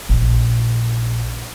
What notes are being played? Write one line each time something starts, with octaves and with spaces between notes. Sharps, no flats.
A#1